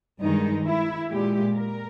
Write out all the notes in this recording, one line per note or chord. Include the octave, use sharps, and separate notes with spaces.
G2 D#3 G#3 D#4
E4
A#2 G#3 G4
A#4